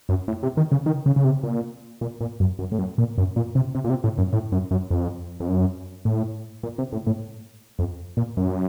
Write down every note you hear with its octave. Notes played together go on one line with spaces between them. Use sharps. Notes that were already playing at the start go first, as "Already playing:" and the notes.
F#2
A2
C3
D#3
C#3
D#3
C#3
C#3
C3
A#2
A#2
A#2
F#2
F#2
A2
F#2
A#2
F#2
A#2
C3
C3
A#2
C3
A2
F#2
A2
F#2
F#2
F2
F2
F#2
A2
A#2
C3
A2
A2
F2
A#2
F#2